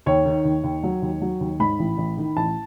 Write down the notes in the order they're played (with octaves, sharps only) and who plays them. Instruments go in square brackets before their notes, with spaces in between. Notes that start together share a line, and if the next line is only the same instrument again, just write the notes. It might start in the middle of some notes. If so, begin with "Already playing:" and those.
[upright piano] D#2 C#5
D#3
D#2
D#2
F#3
D#2
F#3
D#2
G#2 B5
A1
A1
D#3
A1 A5